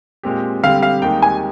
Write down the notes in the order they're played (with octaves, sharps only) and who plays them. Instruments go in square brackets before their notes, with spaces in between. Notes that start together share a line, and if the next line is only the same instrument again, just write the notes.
[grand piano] A#2 G#3 C4 G4
[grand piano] D3 G3 C4 G4 [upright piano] F5
[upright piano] F5
[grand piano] D#2 D#3 G#3 D#4 G4 [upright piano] G5
[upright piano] G#5